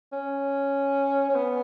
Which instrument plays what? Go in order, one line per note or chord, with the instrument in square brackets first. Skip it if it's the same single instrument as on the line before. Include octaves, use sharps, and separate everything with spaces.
[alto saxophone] C#4
C#4
B3